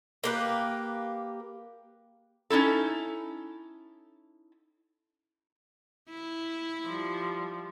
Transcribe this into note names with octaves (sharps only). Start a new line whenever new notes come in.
A#3 G4 B4
C#4 D#4 E4 A4
E4
F3 G3